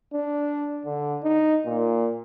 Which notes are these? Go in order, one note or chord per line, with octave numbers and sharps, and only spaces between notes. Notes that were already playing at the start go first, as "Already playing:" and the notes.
D4
D3
D#4
A#2